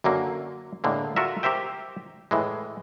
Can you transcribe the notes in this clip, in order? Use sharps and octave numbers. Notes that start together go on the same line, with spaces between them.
F#2 D3 F#3 A#3
A2 D3 G#3 A#3
F4 F#4 A4 A#4 E5
G4 A#4 C5 E5 G5
A2 E3 G#3